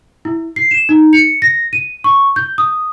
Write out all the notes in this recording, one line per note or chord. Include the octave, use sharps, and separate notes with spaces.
E4
C7
E7
D#4
C#7
A#6
D#7
C#6
G6
D#6